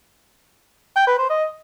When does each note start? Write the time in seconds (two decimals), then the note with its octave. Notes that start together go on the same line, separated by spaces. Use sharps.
0.96 G5
1.07 B4
1.19 C5
1.30 D#5